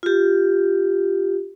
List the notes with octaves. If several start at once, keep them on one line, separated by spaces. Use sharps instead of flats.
F4 G4